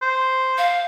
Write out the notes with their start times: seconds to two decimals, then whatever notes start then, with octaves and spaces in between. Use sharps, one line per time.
0.02 C5
0.58 F5